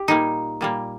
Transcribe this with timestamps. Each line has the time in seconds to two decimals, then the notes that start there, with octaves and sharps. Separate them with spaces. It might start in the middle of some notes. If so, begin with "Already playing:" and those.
Already playing: G4
0.08 A#2 G3 A#3 D#4
0.61 A#2 G3 A#3